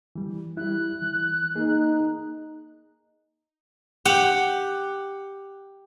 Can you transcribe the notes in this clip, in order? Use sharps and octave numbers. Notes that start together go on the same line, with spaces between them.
E3 G3
G3 E4 F#6
E3
A#3 D#4 G#4
G4 F#5